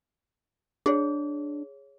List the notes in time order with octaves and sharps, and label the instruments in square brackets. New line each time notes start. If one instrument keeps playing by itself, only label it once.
[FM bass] D4 [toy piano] G#4 C#5